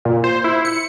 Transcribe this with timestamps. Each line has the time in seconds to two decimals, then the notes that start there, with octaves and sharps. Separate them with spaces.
0.05 A#2
0.24 C5
0.44 E4
0.65 C#7